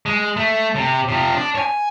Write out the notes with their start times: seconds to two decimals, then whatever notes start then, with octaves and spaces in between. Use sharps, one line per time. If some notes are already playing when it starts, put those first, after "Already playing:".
0.06 G#3
0.37 A3
0.75 C3
1.08 C3 F3
1.34 D4
1.55 C#5 G#5